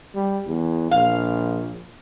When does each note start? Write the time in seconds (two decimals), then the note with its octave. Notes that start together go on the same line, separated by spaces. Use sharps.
0.15 G3
0.46 E2
0.91 A#1 F5